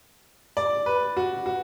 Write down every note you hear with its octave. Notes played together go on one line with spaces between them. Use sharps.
D5
B4
F#4
F#4